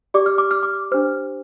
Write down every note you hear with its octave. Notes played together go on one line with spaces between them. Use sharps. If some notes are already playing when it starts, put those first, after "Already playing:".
G4 D5 D6
F6
D6
F6
D6
D4 G4 C5 F6